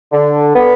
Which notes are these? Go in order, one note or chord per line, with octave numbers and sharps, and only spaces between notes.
D3
B3